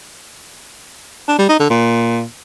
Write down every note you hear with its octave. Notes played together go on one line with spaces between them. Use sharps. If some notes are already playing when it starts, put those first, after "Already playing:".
D4
G3
D#4
D3
A#2